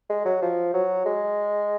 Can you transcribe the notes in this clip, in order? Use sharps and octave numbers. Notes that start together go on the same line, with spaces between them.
G#3
F#3
F3
F#3
G#3